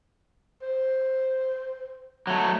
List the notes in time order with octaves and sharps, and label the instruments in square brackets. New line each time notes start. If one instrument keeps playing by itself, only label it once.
[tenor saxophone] C5
[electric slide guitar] F#3 A3